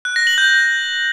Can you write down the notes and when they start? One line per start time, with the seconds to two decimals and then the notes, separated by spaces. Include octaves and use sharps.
0.05 F#6
0.16 A#6
0.27 F#7
0.38 G6